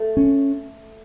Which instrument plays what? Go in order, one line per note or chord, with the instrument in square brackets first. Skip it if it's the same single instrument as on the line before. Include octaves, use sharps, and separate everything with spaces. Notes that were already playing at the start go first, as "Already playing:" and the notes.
Already playing: [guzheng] A3
[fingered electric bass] C#4